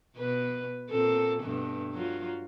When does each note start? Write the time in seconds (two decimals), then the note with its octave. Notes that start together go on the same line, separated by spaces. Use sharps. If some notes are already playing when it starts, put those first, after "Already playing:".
0.17 B2 B4
0.90 A#2 C4 A4
1.42 G2 B2 A3
1.93 F#3 F4